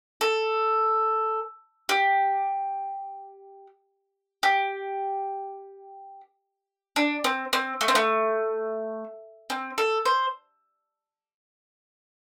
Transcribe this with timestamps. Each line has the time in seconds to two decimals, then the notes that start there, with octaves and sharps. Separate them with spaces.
0.21 A4
1.89 G4
4.43 G4
6.96 D4
7.24 C4
7.53 C4
7.81 A3
7.88 C4
7.95 A3
9.50 C4
9.78 A4
10.06 C5